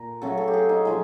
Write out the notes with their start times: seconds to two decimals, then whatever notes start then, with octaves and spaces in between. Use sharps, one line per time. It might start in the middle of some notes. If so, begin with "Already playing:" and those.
Already playing: A#2 A#4
0.22 C#3 F#3 A3 A4
0.37 A4
0.48 G4
0.54 G#4
0.69 D#4
0.85 A2 F3 G#3 E4